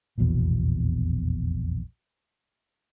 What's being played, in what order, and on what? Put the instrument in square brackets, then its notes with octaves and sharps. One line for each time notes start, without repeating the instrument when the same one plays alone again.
[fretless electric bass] F1 A#1 E2 B2